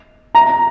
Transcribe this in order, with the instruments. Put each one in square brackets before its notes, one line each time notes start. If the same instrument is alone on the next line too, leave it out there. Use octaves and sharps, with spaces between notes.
[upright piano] A#5